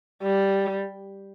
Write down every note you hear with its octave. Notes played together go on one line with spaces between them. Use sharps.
G3